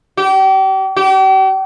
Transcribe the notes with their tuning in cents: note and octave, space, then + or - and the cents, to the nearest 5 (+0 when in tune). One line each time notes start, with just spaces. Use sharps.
G4 -35
G4 -40